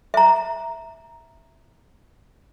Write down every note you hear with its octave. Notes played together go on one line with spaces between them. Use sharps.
E5 A#5